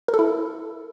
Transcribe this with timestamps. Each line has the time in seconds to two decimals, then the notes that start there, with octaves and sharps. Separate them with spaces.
0.08 A#4
0.14 A4
0.19 E4